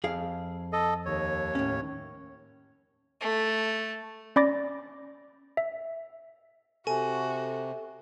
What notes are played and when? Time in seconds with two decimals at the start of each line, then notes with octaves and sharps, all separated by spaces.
0.04 F2 G#4 F5
0.73 A4 D#5
1.06 D#2 C#5
1.55 A2 C#4
3.21 A3
4.36 C#4 D5 B5 D6 A6 A#6
5.57 E5
6.87 C3 F#4 A4 G#5